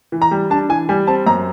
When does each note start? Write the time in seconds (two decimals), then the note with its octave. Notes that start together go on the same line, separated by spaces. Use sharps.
0.12 E3
0.22 A#5
0.31 G3
0.50 D4 A5
0.69 E3 G#5
0.89 G3 G#5
1.07 C4 A5
1.27 F#2 A#5